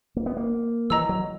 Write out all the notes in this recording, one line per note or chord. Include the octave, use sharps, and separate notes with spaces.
A#3
B3
A#3
E3 D#5 A#5 E6
F#3